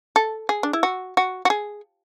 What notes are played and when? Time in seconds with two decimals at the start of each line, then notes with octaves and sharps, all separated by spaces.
0.16 A4
0.49 G#4
0.63 D4
0.73 E4
0.83 F#4
1.17 F#4
1.45 F#4
1.50 G#4